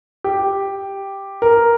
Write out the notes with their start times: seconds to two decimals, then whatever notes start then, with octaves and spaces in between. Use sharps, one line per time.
0.24 G4
1.42 A#4